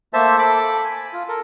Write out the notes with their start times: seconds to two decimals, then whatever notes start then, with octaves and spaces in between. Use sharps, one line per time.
0.13 A3 A#3 A4 C5 E5 A5
0.39 A4 B5 D6
0.84 G#5
1.13 F4
1.28 A4 A#4